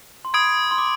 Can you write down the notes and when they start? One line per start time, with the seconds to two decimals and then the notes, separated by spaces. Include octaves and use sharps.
0.25 C6
0.34 B5 D#6 G#6 D7
0.71 C6
0.78 D6